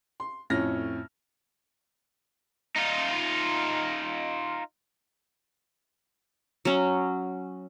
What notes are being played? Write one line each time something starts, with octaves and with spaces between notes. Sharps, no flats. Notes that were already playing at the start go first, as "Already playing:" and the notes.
C6
F2 A2 C#4 F6 A#6
D#4 F4
F#3 C#4